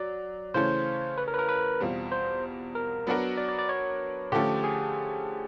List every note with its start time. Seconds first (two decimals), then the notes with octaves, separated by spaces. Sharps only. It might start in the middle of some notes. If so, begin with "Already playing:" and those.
Already playing: F#3 D5
0.54 C#3 E3 A3 C#4 C5
1.18 B4
1.28 A#4
1.34 B4
1.39 A#4
1.49 B4
1.80 E2 B2 G3 C4 F4
2.12 C5
2.75 A#4
3.07 F#3 B3 D4 F#4 A#4
3.37 D5
3.48 D5
3.59 D5
3.69 C#5
4.32 D3 F3 A3 C#4 G4
4.64 G#4